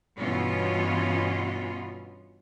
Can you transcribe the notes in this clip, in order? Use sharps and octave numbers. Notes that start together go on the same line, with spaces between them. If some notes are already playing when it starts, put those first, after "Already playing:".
G2 B2 E3 B3 C#4 F4